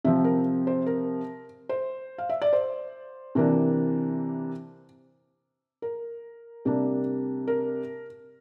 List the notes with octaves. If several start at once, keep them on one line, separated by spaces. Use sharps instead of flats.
C3 F3 C4 E5
A#4
C5
A#4
C5
F5
E5
D5
C5
C3 E3 A#3 D4
A#4
C3 G3 A#3 D4
A#4